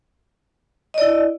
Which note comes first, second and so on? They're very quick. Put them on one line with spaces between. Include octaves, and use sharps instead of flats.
D#5 D5 E4